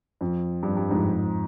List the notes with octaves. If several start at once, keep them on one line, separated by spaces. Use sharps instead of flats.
F2
G2
G2
F2 G#2